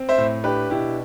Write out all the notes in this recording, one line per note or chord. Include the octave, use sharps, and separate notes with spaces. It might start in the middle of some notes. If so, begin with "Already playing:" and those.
Already playing: C4
C5 E5
A2
D4 G4 B4
B2 E4 G4